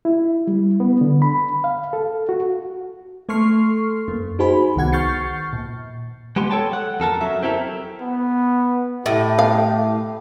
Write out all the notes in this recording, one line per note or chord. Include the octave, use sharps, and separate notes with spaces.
E4
G3
B3
D3
B5
F5
A4
F#4
A3 A4 C6 C#6 F6 C7
F#2 A#3
D#4 F#4 G#4 C5 G#5 B5
C2 D#3 B3 F#5 G#6
C#6 F6 G6 A6 C7 C#7
A#2
G#3 B3 G4 C6
A4 C#5 G5 A5
F#5
F2 A4 A#4 A5
F#2 F#3 E5
C4 E4 G4 A4 A#4
B3
A2 G4
F5